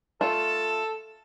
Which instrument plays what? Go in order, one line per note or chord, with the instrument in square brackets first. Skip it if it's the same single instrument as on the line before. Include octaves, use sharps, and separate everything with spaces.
[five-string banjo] A3 F4 [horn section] A4 [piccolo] E7